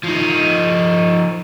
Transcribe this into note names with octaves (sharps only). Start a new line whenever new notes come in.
F3 D#4